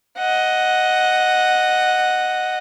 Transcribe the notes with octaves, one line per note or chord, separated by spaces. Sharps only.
D#5 F#5